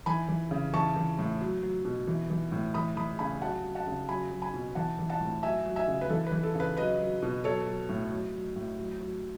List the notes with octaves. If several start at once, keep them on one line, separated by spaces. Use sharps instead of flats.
E3 G#5 B5
E3
C#3
E3 A5 C#6
E3
A2
F#3
F#3
B2
E3
E3
A2
E3 B5 D#6
E3 B5 D#6
C#3 G#5 B5
F#3 F#5 A5
F#3
F#5 A5
C#3
F#3 G#5 B5
F#3
G#5 B5
B2
E3 F#5 A5
E3
F#5 A5
A2
F#3 E5 G#5
F#3
E5 G#5
C#3
B4
E3 A4
B4
E3
A4
C#3 B4
F#3 B4 D#5
F#3
B2
F#3 A4 C#5
F#3
A2
F#3
F#3
A2
F#3
F#3